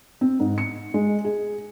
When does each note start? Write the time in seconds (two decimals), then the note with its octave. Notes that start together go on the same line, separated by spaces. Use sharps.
0.21 C4
0.40 G#2
0.58 C#7
0.94 G#3
1.24 G#4